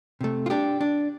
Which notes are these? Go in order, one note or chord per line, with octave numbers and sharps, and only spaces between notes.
C3 A3
F4
D4 G4
D4